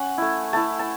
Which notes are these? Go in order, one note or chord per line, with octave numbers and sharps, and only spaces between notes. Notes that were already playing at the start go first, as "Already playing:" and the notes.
Already playing: C#4 F#5
A3 E4
A3 E4 A5
A5